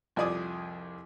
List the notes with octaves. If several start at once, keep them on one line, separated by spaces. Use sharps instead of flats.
C2 F2 F4 D5 G#5 D#6